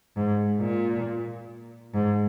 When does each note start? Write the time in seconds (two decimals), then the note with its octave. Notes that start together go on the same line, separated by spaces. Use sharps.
0.16 G#2
0.60 A#2
1.94 G#2